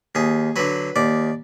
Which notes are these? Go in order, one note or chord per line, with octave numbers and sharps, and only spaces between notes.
D#2 G#4
D3 F#3 B4
D#2 D5